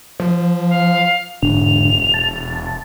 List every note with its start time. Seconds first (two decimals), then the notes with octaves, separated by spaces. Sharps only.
0.20 F3
0.69 F5
1.42 E1 G#2 D3 F7
2.14 A5